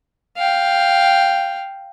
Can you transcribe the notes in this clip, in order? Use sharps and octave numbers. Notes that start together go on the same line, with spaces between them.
F5 G5